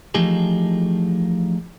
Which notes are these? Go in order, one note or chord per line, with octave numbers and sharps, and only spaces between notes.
E3 F3 A3 D#4 G4 G#4